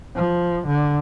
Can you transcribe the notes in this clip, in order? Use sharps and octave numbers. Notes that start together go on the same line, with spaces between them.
F3
D3